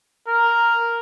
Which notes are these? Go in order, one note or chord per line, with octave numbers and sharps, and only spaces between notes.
A#4